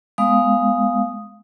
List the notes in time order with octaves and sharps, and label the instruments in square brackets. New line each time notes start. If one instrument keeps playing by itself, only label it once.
[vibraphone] G#3 B3 F5 D#6